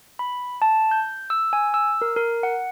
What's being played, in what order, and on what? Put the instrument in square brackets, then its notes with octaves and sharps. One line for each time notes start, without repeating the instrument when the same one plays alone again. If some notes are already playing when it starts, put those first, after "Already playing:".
[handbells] B5
A5
G6
E6
G#5
E6
A#4
A#4
F#5